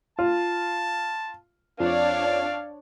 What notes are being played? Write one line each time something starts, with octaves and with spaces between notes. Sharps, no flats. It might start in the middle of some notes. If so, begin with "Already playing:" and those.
F4 A5
F2 D4 C#5 D5 F5